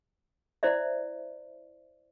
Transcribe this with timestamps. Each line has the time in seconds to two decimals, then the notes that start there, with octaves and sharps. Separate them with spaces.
0.63 E4 C5 D5 E5